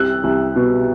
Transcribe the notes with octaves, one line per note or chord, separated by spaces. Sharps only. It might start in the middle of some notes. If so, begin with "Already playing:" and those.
Already playing: C2 C3 E6 F#6
C2
B2